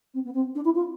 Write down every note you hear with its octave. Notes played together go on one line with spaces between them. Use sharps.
C4
B3
C4
D4
E4
F4